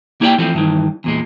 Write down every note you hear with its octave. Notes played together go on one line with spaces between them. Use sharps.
A#3 E4 G4 C#5 D5 G5
E3 F3 A3 C4
G2 D#3 E3
E2 A#2 G#3